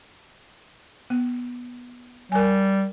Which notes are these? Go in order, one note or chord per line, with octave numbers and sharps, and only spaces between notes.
B3
G3 A#4 G#5